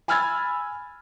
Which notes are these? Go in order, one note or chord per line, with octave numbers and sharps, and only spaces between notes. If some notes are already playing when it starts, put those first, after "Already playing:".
G#5 B5 E6 F6 G#6 A6